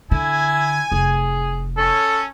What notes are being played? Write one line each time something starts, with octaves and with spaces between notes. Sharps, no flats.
D3 E4 G#5
F1 G#4
C#4 A4